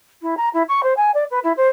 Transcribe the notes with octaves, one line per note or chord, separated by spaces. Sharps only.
E4
A#5
E4
C#6
C5
G#5
D5
B4
E4
C5